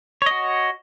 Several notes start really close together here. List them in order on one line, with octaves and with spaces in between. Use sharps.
C#5 D#5 F#4